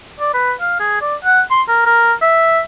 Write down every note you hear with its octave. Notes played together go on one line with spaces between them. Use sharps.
D5
B4
F5
G#4
D5
F#5
C6
A#4
A#4
E5